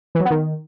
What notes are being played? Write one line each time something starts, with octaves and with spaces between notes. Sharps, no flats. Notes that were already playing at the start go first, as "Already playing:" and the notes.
E3
F#3
B3
D#3